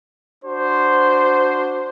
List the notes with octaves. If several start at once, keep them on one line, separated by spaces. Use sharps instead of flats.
D4 F#4 C5